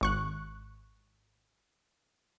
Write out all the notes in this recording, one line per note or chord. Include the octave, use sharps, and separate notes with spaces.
G#1 C#6 F#6